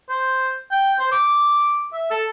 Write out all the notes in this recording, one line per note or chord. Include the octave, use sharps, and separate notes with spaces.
C5
G5
C5
D6
E5
A4